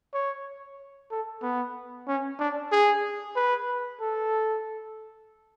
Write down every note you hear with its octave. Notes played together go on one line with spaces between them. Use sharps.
C#5
A4
B3
C#4
D4
G#4
B4
A4